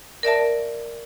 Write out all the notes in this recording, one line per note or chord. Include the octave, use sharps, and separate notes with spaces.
A#4 D5 E5 A5